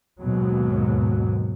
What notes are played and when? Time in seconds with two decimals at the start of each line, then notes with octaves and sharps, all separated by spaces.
0.20 D#2 G#2 B2 F#3